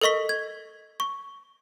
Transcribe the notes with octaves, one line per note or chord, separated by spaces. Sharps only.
A4 A#4 D#5 C#6 B6
G#6
C#6